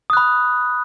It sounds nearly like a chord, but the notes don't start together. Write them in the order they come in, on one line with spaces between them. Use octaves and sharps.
D#6 F#6 B5